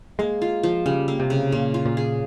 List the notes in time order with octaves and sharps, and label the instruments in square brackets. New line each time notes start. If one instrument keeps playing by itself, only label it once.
[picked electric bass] G#3 [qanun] A#3
[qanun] F4
F3
[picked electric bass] C#3 [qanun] G3
[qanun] A#3
[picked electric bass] C3
[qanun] C#3
[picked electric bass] A#2 [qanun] A#3
[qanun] F4
[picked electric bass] A#2
[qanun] G#4